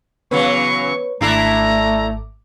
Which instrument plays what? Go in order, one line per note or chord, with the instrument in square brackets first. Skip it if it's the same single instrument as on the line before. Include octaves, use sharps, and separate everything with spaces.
[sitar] C#3 E3 F#3 [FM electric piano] B3 B4 C#5 [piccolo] C#6
[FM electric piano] G#1 D6 [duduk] A3 [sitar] D4 E4 A4 [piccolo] A#5